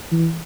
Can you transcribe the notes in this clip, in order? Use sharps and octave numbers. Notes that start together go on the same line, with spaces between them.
E3